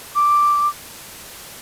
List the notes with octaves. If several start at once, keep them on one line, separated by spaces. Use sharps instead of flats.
D6